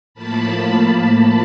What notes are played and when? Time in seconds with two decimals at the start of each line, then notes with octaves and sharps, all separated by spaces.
0.14 A2 F3 A#3 A5 B5
0.54 A5 B5